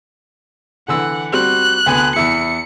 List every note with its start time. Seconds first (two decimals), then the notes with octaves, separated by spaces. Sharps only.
0.88 D3 E3 F#5 E6
1.33 G3 C4 F#4 F#6
1.86 D2 B3 G#5
2.16 E2 E4 C#7